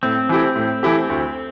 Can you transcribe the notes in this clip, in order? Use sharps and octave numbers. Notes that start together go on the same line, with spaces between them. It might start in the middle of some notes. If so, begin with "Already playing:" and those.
A2 C4
E3 A3 E4 G4
A2
E3 A3 E4 G4
D2